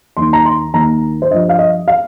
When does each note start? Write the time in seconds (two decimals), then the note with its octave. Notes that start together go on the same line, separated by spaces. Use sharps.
0.17 D#2 D#3 C6
0.33 A#5
0.45 C6
0.74 D#2 D#3 A#5
1.22 C5
1.31 G2 F3 D#5
1.49 F5
1.59 D#5
1.88 F5